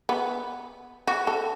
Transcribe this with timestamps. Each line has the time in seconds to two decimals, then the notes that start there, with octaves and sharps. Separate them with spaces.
0.09 B3
1.07 F#4
1.27 A4